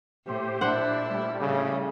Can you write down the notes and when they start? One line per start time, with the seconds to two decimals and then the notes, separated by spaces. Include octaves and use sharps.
0.26 A2 G4 C5
0.61 A#2 D4 E4 C5 F#5
1.04 A2 G3
1.41 C#3 A3